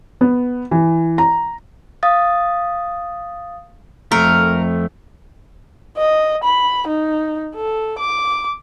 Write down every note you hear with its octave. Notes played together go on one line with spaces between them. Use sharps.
B3
E3
A#5
F5 D#6 A6
F2 A3 A#4
D#5
B5
D#4
A4
D6